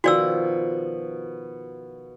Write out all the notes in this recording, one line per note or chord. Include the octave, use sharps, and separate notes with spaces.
B2 D#3 F3 F#4 D5 E6